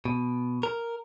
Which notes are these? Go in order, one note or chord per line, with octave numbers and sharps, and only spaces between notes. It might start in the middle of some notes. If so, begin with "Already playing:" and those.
B2
A#4